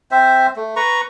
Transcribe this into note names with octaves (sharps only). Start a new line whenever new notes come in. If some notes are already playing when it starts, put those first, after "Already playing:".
C4 C5 E5
A3
B4 A#5 C#6